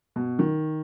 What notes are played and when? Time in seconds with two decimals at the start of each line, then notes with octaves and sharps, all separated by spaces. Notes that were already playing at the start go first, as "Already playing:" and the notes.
0.16 B2
0.39 D#3